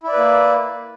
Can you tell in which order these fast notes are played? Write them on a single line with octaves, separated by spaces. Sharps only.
E4 D5 B4 A#3